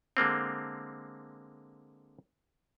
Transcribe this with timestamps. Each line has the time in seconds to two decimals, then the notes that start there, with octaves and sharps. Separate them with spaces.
0.17 D3 G#3 A#3 C4